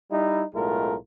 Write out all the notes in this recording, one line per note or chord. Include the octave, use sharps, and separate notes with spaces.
G3 D#4 E4
B1 A2 G#3 A3 F4 A#4